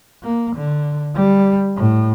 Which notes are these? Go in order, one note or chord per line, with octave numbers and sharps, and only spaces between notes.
A#3
D3
G3
A2